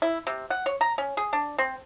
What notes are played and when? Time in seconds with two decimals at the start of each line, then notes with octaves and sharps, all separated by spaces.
0.02 E4
0.27 C3
0.50 F#5
0.66 C#5
0.81 A#5
0.98 C#4
1.17 G#4
1.33 D4
1.58 C4